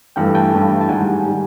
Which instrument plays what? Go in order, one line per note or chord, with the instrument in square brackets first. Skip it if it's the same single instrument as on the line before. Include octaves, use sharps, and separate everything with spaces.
[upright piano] G2 E3 A3 [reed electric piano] F5 G5
[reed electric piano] G5 A5
[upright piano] G2 E3 A3
[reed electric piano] A5
[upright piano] G#2 D#3 G3 [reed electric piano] F#5 G#5
[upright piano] D#3 G3